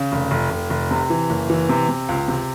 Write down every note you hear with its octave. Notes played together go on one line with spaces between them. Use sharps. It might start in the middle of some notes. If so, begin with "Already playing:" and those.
Already playing: C#3
F1
F1
F1
F1
C3
E3
F#1
E3
C3
C3
C#2
C3